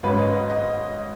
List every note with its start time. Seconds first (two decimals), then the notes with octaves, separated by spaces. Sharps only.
0.03 G#1 G#2 F#3 C#4 B4
0.18 D#5
0.50 D#5